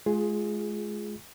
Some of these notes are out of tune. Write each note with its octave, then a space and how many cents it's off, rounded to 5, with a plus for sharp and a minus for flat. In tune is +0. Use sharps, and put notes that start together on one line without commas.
G#3 +30 F4 +0 G#4 +0